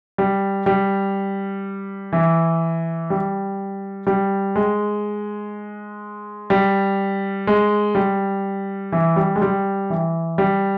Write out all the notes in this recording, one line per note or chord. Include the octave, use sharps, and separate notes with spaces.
G3
G3
E3
G3
G3
G#3
G3
G#3
G3
E3
G3
G#3
G3
E3
G3